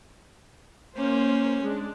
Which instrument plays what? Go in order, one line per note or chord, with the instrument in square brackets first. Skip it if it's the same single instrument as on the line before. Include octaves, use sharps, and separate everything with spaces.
[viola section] A#3 C5 [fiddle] C#4
[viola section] G#3 D4